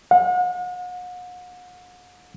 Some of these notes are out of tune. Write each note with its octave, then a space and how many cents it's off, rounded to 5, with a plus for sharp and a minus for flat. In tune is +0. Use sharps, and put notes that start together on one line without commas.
F#5 -40